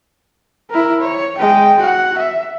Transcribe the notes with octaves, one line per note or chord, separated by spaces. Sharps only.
E4 A#4
C#5
G#3 G5
F#4 F#5
E5